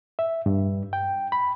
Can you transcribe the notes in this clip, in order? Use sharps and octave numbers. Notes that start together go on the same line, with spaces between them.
E5
G2
G5
B5